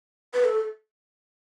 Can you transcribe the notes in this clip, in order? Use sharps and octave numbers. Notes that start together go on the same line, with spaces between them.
B4
A4